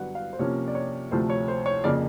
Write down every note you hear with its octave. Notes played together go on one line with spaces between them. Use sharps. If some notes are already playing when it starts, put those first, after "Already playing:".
Already playing: G2 D3 F#3 B3 F#5
F5
C5
C3 F3 A#3 C#4 C#5
D5
C#5
D2 C3 F3 A3 C5
C#5
C5
C#5
F2 C#3 F3 A#3 D5